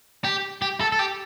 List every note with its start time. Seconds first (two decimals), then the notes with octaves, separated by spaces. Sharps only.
0.24 G4
0.62 G4
0.81 A4
0.92 A4
0.99 G4